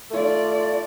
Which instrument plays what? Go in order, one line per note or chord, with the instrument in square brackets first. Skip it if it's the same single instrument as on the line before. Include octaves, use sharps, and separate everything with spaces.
[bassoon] A3 [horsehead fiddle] F4 D5